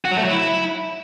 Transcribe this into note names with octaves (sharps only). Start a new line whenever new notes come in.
F#4
F#3
A3
F#3
E4